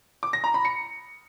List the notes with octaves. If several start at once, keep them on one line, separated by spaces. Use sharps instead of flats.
D6
A#6
A#5
B5
C#7